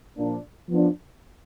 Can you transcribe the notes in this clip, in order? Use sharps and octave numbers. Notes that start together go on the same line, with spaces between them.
A#2 F3 A#3 D4
F3 B3 D4